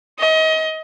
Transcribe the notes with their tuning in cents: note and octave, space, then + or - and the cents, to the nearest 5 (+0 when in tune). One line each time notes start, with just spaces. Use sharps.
D#5 +30